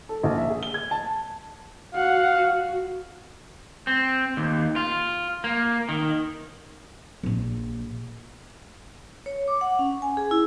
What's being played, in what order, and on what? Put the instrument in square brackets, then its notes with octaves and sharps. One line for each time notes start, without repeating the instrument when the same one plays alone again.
[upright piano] A4
A#1
E5
G#4
G7
G#6
A5
[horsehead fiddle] F#4 F#5 [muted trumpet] F5
[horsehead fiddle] F#4
[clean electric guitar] C4
D#2
F4
A#3
D#3
[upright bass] A#1 A#2
[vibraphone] C#5
D6
F#5
C#4
G#5
G#4
E4